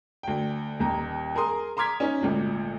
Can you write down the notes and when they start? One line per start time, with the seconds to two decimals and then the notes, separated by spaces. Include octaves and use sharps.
0.23 D2 G5
0.79 D#1 D#2 A#5
1.35 G#4 A#4 A#5 C6 D#6
1.77 A#5 C6 D6 F6 G#6 B6
2.00 C#4 D#4
2.21 G#1 D2 A#2